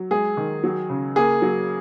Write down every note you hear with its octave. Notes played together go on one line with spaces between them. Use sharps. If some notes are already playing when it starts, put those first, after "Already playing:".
Already playing: F#3
G#3 G#4
D#3
F#3
C#3
A#3 G#4
F#3